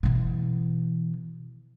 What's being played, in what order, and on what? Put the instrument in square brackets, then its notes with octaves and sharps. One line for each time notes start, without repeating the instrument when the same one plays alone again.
[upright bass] B2 E3